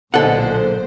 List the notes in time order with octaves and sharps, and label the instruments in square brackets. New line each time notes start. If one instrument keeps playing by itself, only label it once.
[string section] B1 A#2 C5 [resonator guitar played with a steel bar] D3 G#3 [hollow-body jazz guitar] A4 F#5